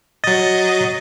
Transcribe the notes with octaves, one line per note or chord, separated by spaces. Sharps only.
F#3 D#5 A6